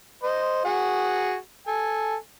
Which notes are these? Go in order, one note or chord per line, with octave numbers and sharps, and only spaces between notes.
C5 D#5
F#4 G#4 F#5
A4 G#5